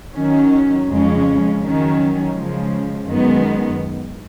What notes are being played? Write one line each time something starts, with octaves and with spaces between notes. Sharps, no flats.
D#3 F#3 C#4
F2 C#3 G#3 C#4
D#3 F#3 C#4
C#3 F3 G#3
F#2 D#3 G#3 B3